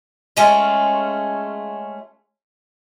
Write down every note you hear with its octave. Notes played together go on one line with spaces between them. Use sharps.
G#3 A3 C#4 F4